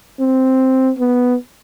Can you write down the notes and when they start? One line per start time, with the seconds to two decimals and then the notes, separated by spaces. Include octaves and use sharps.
0.19 C4
0.99 B3